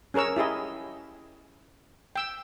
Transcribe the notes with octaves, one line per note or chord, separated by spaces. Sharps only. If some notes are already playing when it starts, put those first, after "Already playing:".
C#4 G#4 A#4 C#5 E6
E4 G4 G#4 D#5
G5 E6